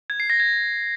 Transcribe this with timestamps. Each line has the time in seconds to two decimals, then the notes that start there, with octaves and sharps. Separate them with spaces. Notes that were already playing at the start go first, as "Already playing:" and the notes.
0.10 G#6
0.20 C7
0.30 A#6
0.40 G#6